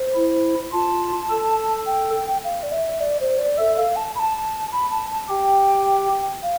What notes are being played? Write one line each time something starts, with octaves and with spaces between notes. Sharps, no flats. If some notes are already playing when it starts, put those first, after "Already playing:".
Already playing: C5
E4
F4 A5
A4
G5
F5
D5
E5
D5
C5
D5
A4 E5
F5
A5
B5
A5
B5
A5
A5
G4 G5
F5